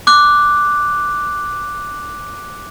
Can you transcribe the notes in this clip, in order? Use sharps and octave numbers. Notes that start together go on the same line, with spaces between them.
D6 F#6